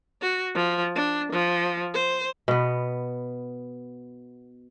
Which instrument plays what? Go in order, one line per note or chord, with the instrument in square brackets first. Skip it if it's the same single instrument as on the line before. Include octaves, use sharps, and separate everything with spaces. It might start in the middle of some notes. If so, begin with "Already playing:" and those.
[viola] F#4
F3
D4
F3
C5
[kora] B2 B3